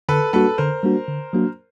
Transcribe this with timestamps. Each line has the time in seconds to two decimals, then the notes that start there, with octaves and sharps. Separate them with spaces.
0.09 D3 A4 B4
0.33 G3 A#3 D4 F#4 A4 B4
0.58 D3 A#4 C5
0.83 G3 A#3 D4 F#4
1.08 D3
1.33 F#3 A#3 D4 F#4